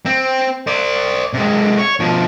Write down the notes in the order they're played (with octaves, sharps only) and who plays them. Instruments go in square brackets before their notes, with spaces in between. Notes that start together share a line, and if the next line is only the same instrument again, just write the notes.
[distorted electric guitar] C4
C5 D5
C3 G#3
C#5
B2 F3